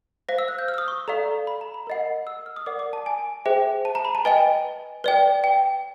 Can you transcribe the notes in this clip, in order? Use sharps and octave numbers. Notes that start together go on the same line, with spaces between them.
C5 F5 A#6
E6
F#6
G6
F6
E6
D#6
C#6
A4 D5 F5 A#5
B5
A#5
B5
A#4 D#5 F#5
E6
F6
D#6
A#4 D5 F#5 D6
D6
A5
G#5
G#4 C5 E5 G5
A5
A#5
B5
A5
B4 D#5 G5 G#5
B4 D5 G5
G5